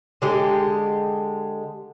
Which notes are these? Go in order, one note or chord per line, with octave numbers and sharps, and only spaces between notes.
D3 G#3 G4